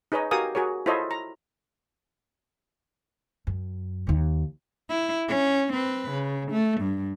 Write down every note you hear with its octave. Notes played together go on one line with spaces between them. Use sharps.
D#4 G#4 B4 C#5 D#5
F#4 G4 A#4 F5 G#5 D#6
F#4 G#4 A#4 C#5
E4 F4 A4 C5 C#5 D#5
A#5
F#2
D#2 D#3
E4
C#4
C4 B4
C#3
A3
G2